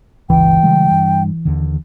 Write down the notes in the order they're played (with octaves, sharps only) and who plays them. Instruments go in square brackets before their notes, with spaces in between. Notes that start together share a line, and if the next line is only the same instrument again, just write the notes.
[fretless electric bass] G1 C#2 [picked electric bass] E3 [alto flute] G5
[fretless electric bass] C#3 G3 G#3
G2 G3
D#2 D3